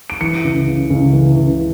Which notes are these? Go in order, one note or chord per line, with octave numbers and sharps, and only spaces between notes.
D7
E3 C#7
C#2
C#3
C#2
E3
C#2